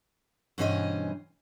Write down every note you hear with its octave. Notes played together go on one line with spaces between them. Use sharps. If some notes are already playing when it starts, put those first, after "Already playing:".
G2 B2 E3 C#4 C5 D#5